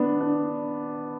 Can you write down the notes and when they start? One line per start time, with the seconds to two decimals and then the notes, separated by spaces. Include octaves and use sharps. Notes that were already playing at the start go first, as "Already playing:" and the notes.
Already playing: B3 D4
0.21 D4